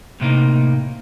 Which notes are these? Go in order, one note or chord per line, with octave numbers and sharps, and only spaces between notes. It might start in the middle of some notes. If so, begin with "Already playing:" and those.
A2 C3 A#3 D#4